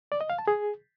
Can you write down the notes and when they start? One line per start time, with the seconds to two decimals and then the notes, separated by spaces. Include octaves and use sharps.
0.12 D5
0.21 D#5
0.30 F5
0.39 A5
0.48 G#4